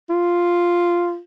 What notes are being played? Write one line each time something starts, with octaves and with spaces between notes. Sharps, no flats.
F4